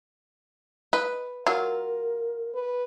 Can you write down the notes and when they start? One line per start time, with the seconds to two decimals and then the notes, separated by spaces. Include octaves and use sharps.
0.93 B4 D#5
1.47 F#3 F4 A#4
2.54 B4